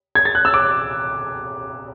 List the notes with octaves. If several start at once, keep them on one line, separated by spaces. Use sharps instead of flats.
G#6
A6
F#6
E6
D6